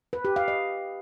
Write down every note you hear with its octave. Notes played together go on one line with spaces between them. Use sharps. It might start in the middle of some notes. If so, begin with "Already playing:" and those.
B4
G4
F5
D#5